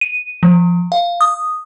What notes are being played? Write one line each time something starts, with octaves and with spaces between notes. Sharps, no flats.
D#7
F3
F5
D#6